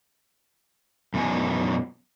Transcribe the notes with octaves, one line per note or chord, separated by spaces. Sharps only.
F#2 B2 E3 D#4 G#5